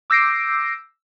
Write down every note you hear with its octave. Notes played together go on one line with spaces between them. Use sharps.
D6 E6 G6 A#6 C7 D7